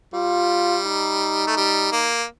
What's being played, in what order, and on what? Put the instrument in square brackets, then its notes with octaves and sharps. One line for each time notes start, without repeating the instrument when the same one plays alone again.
[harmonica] G3 [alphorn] F4
[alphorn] D#4
[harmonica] A3
G3
A#3